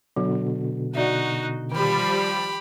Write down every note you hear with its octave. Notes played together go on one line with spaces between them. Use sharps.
B2 D3 F#3
D#4 F#4 D5 E5
D#3 F3 G3 G4 B5